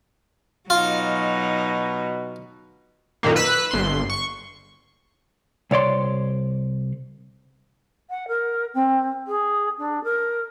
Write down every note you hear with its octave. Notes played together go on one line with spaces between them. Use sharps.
B2 F#3 D#4 F4
F#2 A#2 D#3 A#3
B4 E6 F#6 B6
G1 C6
C#6
C2 C#5 D5 C6
F#5
A#4
C4
G#4
D4
A#4